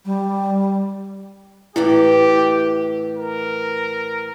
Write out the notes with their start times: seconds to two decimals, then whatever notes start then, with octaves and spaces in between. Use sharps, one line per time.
0.05 G3
1.76 A2 E3 E4 G4 A4
3.17 A#4